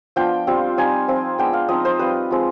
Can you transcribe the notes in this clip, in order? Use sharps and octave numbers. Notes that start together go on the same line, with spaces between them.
F3 B3 D4 F4 G5
G3 C4 F4
G3 C4 D#4 G#5
F3 C4 F4
G#3 B3 D4 G5
F5
F3 C4 D#4 D#5
C5
G3 C4 F4 B4
F3 G#3 C4